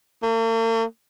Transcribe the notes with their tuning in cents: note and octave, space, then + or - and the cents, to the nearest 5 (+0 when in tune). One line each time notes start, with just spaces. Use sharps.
A#3 -45